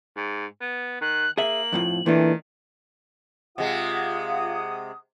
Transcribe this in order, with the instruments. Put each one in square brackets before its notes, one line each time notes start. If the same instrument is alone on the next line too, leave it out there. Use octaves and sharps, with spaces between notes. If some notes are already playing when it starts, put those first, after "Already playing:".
[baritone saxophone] G#2
B3
[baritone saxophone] D#3 [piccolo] F#6
[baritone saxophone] A#3 [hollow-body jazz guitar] G#4 E5 [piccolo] F#7
[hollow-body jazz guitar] F2 A2 F3
[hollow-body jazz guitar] A#2 A3 D4 [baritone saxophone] D#3 [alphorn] E3
[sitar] C3 G#3 [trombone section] F4 [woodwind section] F#5 D#6